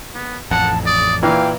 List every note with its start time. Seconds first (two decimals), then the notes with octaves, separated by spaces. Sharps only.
0.14 B3
0.51 A1 F2 F#5 A5
0.86 D5 D#6
1.22 A#2 E3 F5 G5